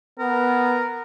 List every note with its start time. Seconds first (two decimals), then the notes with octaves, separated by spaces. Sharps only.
0.19 B3 A#4